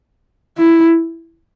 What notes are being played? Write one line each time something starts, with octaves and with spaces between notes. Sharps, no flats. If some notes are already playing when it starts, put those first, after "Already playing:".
E4